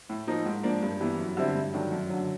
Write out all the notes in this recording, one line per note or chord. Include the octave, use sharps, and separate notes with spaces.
A2
F3 A#3 D#4
G#2
F3 A#3 D4
G2
E3 G3 B3
F#2
D3 G3 C4 E4
G2
D#3 F#3 A3 D4
F#2
D3 F#3